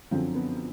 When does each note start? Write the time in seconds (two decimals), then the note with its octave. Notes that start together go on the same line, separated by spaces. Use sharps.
0.11 F#2 D3 F3 C4
0.35 B3